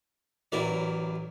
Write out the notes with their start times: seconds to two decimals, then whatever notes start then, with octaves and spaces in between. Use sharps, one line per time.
0.52 A1 E3 F#3 A#4 D5